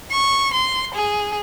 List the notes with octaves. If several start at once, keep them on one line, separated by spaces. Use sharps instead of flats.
C#6
C6
G#4